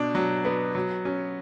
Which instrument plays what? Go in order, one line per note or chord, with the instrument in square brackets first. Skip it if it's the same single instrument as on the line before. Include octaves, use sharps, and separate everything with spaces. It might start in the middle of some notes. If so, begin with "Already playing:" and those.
Already playing: [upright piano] B2 D4
F#3
B3
F#3
C#4